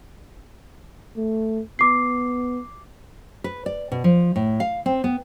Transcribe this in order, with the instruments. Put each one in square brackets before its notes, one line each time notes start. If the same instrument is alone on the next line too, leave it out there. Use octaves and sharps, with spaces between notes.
[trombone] A3
[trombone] B3 [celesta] D6 C7
[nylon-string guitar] B4
D5
B2
F3
A2
F5
C4
B3